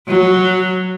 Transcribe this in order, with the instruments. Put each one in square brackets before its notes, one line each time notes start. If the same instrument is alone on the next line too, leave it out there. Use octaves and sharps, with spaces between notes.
[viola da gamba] F#3